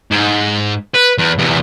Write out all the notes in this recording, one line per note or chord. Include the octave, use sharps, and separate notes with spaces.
G#2
B4
E2
E2 C3